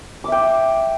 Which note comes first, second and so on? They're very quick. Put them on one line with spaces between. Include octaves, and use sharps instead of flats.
D6 E5 G5